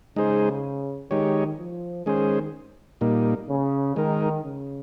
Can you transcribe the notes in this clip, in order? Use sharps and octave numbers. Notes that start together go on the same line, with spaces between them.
C#3 G#3 D#4 G#4 C5
D#3 G#3 D#4 G4 C#5
F3
D#3 G#3 C#4 G#4 C5
A#2 G3 A#3 D#4
C#3
D#3 G#3 D#4 A#4
C#3